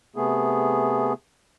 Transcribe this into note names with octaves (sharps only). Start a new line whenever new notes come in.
C3 A3 B3 G#4